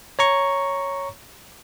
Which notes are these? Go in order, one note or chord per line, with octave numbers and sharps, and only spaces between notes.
C#5 A#5 C#6